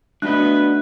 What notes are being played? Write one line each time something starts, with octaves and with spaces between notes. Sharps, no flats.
A3 B3 D4 F#4 B4 D#5 F#6